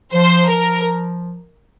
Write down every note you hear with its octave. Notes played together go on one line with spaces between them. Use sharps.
F3 C5
F3 A#4